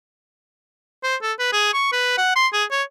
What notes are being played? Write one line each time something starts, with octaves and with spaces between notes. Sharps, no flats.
C5
A4
B4
G#4
C#6
B4
F#5
C6
G#4
C#5